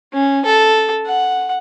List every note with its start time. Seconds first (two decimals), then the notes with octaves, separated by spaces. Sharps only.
0.13 C#4
0.45 A4
1.06 F#5